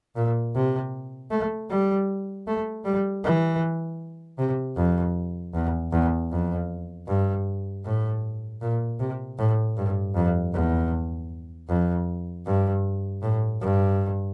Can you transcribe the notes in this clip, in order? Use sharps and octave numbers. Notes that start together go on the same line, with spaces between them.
A#2
C3
A3
G3
A3
G3
E3
C3
F2
E2
E2
F2
G2
A2
A#2
C3
A2
G2
F2
E2
F2
G2
A2
G2